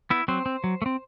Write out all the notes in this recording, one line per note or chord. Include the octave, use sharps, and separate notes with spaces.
B3 E4 E5
F#3 C4 C5
C4
F#3
A3
C4